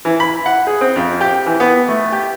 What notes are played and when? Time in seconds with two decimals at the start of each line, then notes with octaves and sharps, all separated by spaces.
0.05 E3
0.20 B5
0.46 F#5
0.67 G#4
0.81 C4
0.96 F2
1.21 G4
1.46 E3
1.60 B3
1.89 A3
2.12 G4